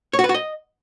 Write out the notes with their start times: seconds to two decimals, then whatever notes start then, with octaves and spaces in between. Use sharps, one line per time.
0.13 C#5
0.19 F#4
0.24 B4
0.29 F#4
0.34 D#5